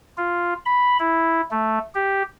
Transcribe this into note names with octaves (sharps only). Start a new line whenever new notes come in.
F4
B5
E4
A3
G4